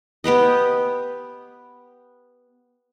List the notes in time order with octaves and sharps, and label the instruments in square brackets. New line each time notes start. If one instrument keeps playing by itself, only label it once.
[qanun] B3 G4 B4 D#5